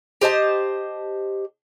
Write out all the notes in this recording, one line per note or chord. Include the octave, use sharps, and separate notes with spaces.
G4 C5 D#5 A5